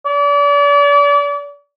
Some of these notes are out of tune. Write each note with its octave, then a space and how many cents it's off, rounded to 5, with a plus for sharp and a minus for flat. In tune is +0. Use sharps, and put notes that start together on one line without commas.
D5 -35